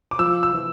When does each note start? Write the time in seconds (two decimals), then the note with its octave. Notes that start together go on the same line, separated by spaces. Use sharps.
0.11 D6
0.19 F3 E6
0.43 E6
0.54 E3